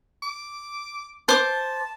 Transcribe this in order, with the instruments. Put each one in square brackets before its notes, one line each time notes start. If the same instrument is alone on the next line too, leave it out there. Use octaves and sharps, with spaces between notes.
[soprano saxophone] D6
[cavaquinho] C5 D6 [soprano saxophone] A5